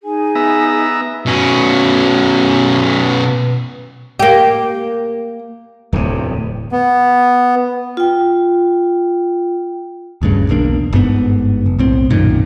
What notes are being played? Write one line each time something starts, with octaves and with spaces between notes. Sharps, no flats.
D#4 G#4 G#5
B3 E5 A#5
B2 C#4
A#3 G4
D1 E2 C3
B3
F4 G5
D#1 D2 G2 C#3
B1 E2 A#3 D4
G1 G#2 C#3 B3
F#1
B1 A2 C4
B1 F#2 A#2 D#3